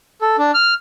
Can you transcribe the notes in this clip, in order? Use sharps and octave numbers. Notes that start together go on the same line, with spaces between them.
A4
D4
F6